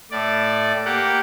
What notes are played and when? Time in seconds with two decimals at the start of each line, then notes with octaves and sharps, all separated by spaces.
0.11 A2 D5
0.85 A#3 G4 F#5